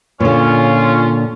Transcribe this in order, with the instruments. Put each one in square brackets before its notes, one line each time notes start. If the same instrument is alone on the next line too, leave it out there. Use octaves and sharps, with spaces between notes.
[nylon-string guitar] A#2 D3 [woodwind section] C#4 F4